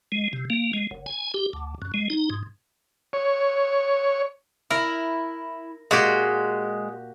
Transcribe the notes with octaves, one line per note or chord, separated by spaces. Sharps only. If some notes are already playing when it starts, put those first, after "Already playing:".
G#3
C3
A#3
G#3
F#1
G#5
G4
D2
F#2
G#3
D#4
G#2
C#5
E4 A#4
A#2 G#3 F#4 G4